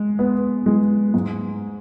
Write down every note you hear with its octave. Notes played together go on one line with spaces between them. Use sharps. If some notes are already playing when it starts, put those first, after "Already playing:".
Already playing: G#3
B3
G#3
G#2